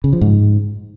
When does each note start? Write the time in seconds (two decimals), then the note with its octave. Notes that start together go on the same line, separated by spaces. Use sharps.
0.04 C#3
0.13 F3
0.21 G#2